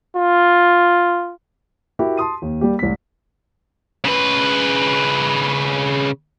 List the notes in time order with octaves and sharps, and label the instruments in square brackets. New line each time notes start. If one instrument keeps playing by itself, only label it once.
[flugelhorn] F4
[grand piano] E4 F#4 G4 A#4 E5
A5 C6 D#6 D#7
D#2
G3 A#3 G4
C2 A2 B6
[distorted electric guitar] C#3 B4